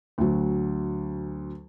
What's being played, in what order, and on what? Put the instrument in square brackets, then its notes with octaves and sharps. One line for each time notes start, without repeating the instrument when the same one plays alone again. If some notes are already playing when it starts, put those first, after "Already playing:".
[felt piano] D2 F#3